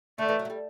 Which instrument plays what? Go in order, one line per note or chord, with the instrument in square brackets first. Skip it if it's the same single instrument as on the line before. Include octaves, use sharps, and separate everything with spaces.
[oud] D3 [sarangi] A3
[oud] E3
F#3
A3
G3